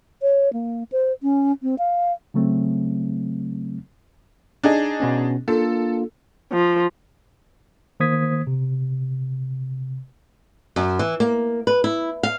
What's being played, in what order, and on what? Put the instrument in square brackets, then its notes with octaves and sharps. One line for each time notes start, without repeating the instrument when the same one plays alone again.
[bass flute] C#5
A#3
C5
C#4
C4
F5
[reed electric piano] C#3 F#3 A3 C4
[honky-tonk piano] D4 D#4 G#4
[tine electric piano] B2 B3 C#4
[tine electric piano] A#3 D4 F4 [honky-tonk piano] A4
[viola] F3
[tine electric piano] D#3 A#3 C5 D#6 G#6 B6
C3
[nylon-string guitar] F#2
E3
A#3
B4
E4
F5